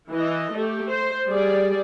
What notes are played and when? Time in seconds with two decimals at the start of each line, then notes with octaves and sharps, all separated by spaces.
0.11 E3 D#5
0.53 A3 G4
0.90 C5
1.28 G3 G#4 D5